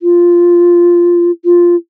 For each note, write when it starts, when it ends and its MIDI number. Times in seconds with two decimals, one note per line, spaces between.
0.01 1.31 65
1.45 1.75 65